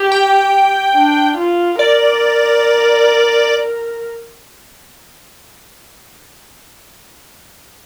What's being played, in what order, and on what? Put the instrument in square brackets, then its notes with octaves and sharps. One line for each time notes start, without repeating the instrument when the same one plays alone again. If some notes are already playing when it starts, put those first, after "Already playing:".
Already playing: [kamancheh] G4
[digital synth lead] G5
[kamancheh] D4
F4
[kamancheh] A#4 [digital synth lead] D5